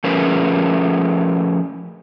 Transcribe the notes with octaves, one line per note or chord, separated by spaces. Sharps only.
F3 A3 C#4 G#4 A#4 B4